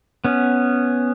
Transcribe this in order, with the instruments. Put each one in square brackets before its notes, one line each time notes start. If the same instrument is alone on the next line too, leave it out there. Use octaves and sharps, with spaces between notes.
[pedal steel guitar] B3 C#4